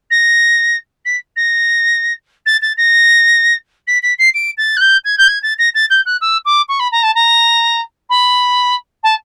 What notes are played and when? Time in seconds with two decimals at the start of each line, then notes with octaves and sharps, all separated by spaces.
0.10 A#6
1.05 B6
1.36 A#6
2.46 A6
2.61 A6
2.77 A#6
3.87 B6
4.02 B6
4.18 C7
4.34 D7
4.57 A6
4.76 F#6
4.80 G6
5.04 G#6
5.17 G6
5.27 G#6
5.42 A6
5.58 A#6
5.74 A6
5.90 G6
6.05 F#6
6.21 E6
6.45 D6
6.68 C#6
6.79 B5
6.92 A#5
7.03 A5
7.15 A#5
8.09 B5
9.03 A5